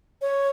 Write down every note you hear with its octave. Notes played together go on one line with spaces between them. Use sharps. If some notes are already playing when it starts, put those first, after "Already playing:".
C#5